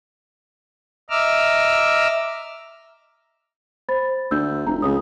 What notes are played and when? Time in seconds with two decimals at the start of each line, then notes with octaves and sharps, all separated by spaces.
1.10 D#5 E5 A#5 D6 E6 F6
3.89 C5 B5 A6
4.31 D2 E6 G6
4.67 F1 A#5
4.82 C#2 D#6